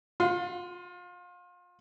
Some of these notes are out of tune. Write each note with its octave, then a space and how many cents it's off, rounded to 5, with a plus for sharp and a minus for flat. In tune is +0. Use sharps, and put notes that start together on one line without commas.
F4 +30 F#5 +5 C6 -10